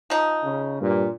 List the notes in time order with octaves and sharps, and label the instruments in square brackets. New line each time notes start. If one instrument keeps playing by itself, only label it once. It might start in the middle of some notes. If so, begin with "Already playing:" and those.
[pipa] F3 D#4
[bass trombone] C#3
[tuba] G2 [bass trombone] A#2